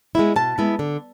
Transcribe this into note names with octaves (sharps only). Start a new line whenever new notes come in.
G#3 B3 E4
B2 A5
G#3 B3 E4
D3